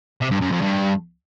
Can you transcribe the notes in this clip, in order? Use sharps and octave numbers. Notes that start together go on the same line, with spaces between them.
C3
G2
F#2
F2
G2